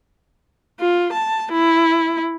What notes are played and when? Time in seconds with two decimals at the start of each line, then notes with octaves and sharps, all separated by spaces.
0.80 F4
1.13 A5
1.52 E4